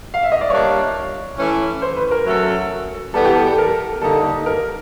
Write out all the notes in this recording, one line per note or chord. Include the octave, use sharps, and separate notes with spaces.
F5
E5
D#5
D5
G3 A#3 D4 F4 C#5
E3 A3 C#4
C5
B4
A#4
F#3 A3 C#4 F#4 A4
E3 G3 B3 A4
G4
A4
A4
A#4
D3 G3 A#3 D#4 A4
A#4